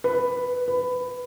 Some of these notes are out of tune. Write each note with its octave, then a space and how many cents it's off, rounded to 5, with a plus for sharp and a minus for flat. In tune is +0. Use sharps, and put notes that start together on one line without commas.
B4 +5
B4 +15